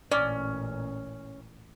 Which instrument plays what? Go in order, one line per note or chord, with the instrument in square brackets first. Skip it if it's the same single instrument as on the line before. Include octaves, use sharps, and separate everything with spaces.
[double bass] A1 A#2 [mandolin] C#4 [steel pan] D5